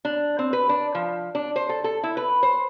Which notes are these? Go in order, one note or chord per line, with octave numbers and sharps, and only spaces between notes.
D4
C4
B4
D4
F3
D4
C5
A4
A4
E4
B4
C5